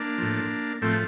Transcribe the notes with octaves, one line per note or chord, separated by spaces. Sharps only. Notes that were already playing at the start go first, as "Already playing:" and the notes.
Already playing: A#3 D4
A2 F3
A2 F3 A3 C4